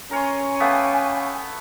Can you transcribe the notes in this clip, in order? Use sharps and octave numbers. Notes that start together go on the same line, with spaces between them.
C#4 A#4 C#5 G#5 C6
A3 B3 E5 F5 G5 D6